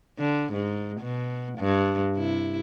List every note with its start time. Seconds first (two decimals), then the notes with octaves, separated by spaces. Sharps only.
0.19 D3
0.53 G#2
1.01 B2
1.58 G2
2.16 C3 E4